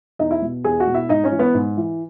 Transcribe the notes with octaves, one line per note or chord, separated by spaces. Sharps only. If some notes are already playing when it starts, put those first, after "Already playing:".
E2 D#4 D#5
E4 E5
B2
E2 G#4 G#5
F#4 F#5
B2
E4 E5
G#2 D#4 D#5
C#4 C#5
E3
B3 B4
G#2
E3